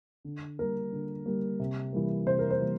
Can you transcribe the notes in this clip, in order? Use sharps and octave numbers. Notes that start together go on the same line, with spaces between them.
D3
G3 A#3 A#4
D3
G3 A#3
C3
E3 G3 A#3
C3 C5
A#4
C5
E3 G3 A#3